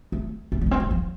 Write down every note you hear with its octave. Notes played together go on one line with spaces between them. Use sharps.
A3
A3
G3
A3
C4
A3
F3